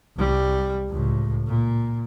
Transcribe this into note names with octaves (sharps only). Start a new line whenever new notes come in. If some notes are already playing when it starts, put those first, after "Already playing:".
C2 G3
C#2 A2
A#2